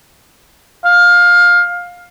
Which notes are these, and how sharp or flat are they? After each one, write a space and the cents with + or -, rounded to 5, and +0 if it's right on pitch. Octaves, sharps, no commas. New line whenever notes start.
F5 +20